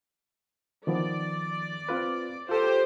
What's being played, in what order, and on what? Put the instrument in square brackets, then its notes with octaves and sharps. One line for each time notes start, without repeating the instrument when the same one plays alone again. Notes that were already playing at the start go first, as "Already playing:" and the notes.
[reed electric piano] D#3 F3 B3 [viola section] D5
[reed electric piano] C4 F4 B4
[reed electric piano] F4 A4 [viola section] G4 C5